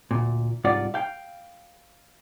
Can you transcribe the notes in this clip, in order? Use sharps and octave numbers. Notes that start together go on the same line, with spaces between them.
D2 A#2
C2 G#2 F4 D5 F#5
F5 G5